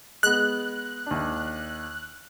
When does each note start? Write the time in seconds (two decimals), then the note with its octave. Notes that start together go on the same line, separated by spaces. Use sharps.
0.23 G#3 B3 F#6
1.06 D#2 D4